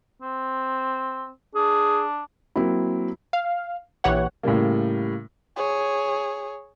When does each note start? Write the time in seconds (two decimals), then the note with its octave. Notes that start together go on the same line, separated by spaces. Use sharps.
0.22 C4
1.55 D4 G#4
2.56 F#3 A#3 C4 E4
3.33 F5
4.04 A#1 E3 G4 C#5 F#5
4.43 A2 C#3 G3 A#3
5.56 G#4 C#5